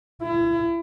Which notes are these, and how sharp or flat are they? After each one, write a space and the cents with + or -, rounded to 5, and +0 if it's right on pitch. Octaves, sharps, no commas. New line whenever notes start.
E4 +35